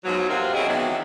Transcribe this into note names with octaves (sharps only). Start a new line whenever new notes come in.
G#2 B2 F3 F#3
C3 A#3 C4 F4 F#4 A#4
B2 C4 C#4 E4 G#4 D#5
D#3 E3 F#3 G#3 B3 D4